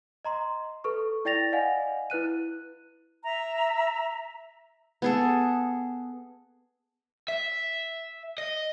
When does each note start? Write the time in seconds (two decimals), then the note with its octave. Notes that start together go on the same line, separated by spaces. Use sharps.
0.25 D#5 A#5 C6
0.84 A4 B4 C#6
1.25 E4 D5 G5 A6 A#6 F7
1.52 D5 D#5 F5 F#5 G#5
2.10 E4 B4 F#6 D#7
3.24 E5 A#5
5.02 B3 G#4 A4
7.28 E5
8.38 D#5